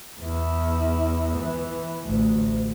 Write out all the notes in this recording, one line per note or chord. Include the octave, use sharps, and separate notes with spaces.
E2 E4
E3
A1 D2